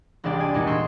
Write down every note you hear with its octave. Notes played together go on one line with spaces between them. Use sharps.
E1 C2 G#3 D4 G4 D5
D5 G#5
E2 A#2 G#3 D#4 D#7
C6 C#6 E6 G6 B6